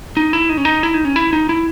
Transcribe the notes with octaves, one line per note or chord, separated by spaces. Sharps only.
D#4
E4
D#4
C#4
D#4
E4
D#4
C#4
E4
D#4
E4